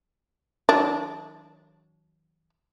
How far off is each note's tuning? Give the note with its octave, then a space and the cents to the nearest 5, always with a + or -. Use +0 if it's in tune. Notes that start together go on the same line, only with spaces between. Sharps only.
D#3 +45 F#3 +0 D4 -20